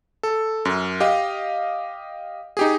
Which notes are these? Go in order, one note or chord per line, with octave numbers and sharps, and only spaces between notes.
A4
F#2
G4 D#5 F5
D#4 G4 G#4